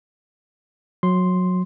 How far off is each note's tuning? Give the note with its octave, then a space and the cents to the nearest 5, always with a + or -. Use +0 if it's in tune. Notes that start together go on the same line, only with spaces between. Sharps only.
F#3 -20 C6 +0